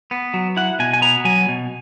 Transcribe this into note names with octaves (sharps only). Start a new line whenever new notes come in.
B3
F#3
E4 F#5
B2 G#5
G#5
B3 A#5
F#3 G#5
B2